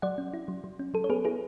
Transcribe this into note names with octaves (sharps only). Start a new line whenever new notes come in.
F#3 D5 F#5
C#4
E4
F#3
F#3
C#4
F#3 A4
C#5
B3 G#4 B4
E4 G#4 B4